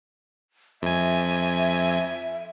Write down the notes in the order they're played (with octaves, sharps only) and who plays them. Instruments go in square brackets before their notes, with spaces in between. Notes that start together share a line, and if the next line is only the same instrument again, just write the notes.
[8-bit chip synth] F2 G#5 [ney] E5